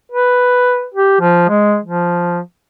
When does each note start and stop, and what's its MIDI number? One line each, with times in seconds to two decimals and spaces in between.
0.12 0.86 71
0.94 1.18 67
1.21 1.47 53
1.48 1.78 56
1.84 2.39 53